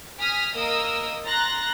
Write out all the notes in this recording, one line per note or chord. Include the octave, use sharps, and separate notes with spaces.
G#5 D#6 F6 B6
A#3 A#4 D#5 D#6 E6
A#5 C6 F#6 A6 A#6